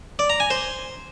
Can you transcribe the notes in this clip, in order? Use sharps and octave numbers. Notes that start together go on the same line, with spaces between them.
D5
A#5
G#5
C5